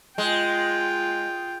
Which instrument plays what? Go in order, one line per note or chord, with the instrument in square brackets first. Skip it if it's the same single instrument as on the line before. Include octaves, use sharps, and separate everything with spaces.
[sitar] G#3 [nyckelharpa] F4 G5